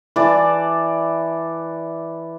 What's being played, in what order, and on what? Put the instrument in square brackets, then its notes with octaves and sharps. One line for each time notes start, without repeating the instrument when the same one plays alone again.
[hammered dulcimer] E3 D5 A5